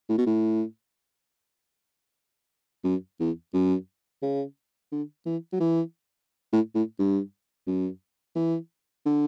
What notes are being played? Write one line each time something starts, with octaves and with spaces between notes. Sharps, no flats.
A2
B2
A2
F#2
E2
F#2
C#3
D3
E3
F#3
E3
A2
A2
G2
F#2
E3
D3